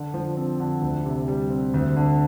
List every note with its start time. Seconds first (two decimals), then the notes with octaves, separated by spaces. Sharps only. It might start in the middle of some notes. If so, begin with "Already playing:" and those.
Already playing: D3
0.14 F3
0.37 C4
0.60 D3
0.82 D2
1.05 C3
1.28 G3
1.50 C4
1.74 D2
1.96 D3